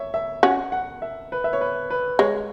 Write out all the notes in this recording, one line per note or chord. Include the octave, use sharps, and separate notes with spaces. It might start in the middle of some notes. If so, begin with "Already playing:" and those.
Already playing: C#5 E5
E5
C#4 F#4 F#5
F#5
E5
B4
E5
C#5
B4
B4
G#3 C#5